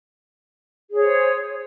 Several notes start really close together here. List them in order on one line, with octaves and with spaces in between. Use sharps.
G#4 C#5 C5